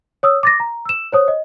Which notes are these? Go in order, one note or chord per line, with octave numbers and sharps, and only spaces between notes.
C#5 D#6 E6
D6 A6 A#6
A#5
E6 E7
C5 C#5 D#6
D#5